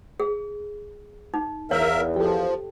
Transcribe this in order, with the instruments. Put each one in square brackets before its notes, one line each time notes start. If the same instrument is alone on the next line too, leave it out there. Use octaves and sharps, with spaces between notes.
[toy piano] G#4
D#4
[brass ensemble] E2 [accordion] A#4 E5 [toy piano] C#5 [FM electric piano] F5
[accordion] F3 [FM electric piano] G4 A4